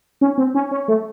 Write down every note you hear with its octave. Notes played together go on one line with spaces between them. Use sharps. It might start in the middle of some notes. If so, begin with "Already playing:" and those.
C#4
C4
C#4
C#4
A3